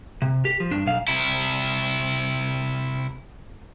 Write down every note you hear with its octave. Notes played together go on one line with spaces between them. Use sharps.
C3
G4
F3
G2 D4
B1 F5
C3 E4